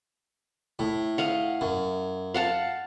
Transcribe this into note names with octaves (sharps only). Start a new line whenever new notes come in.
A2
D#5 F5 F#5
F#2
F5 F#5 A5